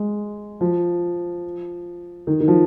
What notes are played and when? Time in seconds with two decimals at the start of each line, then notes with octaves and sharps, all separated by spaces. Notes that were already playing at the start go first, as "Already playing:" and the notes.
Already playing: G#3
0.61 F3
2.27 D#3
2.40 D#3
2.48 F3